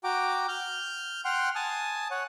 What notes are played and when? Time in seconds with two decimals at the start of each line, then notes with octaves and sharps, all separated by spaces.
0.04 F#4 G5 A#5 D6
0.48 F6 G6
1.25 F#5 G5 C6 F6
1.55 G#5 A5 D#6
2.11 C#5 F#5